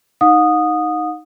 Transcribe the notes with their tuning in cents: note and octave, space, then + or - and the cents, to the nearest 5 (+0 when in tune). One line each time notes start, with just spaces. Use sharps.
D#4 +0 F#5 -45 D#6 -10